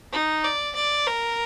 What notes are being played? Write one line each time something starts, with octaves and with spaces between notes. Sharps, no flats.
D#4
D5
D5
A#4